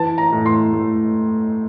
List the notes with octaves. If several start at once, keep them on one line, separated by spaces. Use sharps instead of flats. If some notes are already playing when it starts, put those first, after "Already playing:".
Already playing: E3 A5
A#5
A2
C6
A3